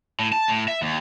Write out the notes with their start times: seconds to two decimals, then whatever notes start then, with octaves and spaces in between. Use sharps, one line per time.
0.19 A2
0.32 A5
0.49 A2
0.68 E5
0.82 D#2